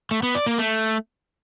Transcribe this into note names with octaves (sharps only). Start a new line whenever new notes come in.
A3
B3
D5
A#3
A3